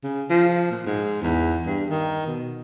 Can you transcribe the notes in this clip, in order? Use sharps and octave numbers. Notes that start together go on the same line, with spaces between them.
C#3
F3
A#2
G#2
E2
G2
D#3
B2